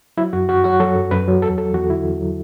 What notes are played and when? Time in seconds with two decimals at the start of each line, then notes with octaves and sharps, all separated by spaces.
0.17 F#3 E4
0.33 F#2 F#4
0.49 F#2 F#4
0.64 F#3 F#4
0.80 F#3 A4
0.96 F#2
1.11 F#2 B4
1.28 F#3
1.42 E2 A4
1.58 F#3 A4
1.74 E2 F#4
1.89 D3 E4
2.05 E2
2.21 F#3